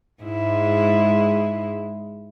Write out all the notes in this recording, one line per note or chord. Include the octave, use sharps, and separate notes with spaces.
G#2 G#3 E4